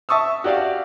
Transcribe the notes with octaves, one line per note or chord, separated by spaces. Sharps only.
E5 A5 C#6 D#6 E6
F#4 G4 D5 E5 F5